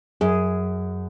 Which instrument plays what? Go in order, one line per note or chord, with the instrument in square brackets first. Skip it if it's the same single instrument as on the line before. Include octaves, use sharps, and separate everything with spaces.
[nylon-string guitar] F#2 [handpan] G#4